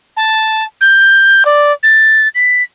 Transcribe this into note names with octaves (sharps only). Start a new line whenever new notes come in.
A5
G6
D5
A6
B6